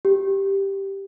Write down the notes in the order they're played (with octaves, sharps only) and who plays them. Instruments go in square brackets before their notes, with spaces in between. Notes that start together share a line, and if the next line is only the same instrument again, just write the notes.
[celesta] G4